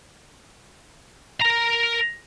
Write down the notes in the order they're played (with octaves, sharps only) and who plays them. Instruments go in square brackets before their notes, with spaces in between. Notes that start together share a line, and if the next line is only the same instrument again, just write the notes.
[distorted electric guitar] A#4 A#5